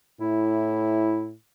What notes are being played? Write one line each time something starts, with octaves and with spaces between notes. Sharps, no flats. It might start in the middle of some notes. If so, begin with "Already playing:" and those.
A2 E4